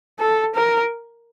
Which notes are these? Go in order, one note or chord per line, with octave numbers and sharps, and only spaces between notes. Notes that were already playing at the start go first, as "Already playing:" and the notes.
A4
A#4